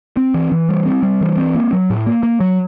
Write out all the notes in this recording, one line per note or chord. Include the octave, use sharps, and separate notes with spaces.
C4
E3
E3
G3
C4
G3
E3
C4
A#3
F#3
A2
A#3
A#3
F#3